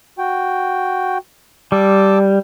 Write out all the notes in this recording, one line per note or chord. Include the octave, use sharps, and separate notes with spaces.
F#4 G5
G3 A5 D6 E6